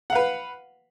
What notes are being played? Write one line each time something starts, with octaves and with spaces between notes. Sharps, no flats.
B4 F5 F#5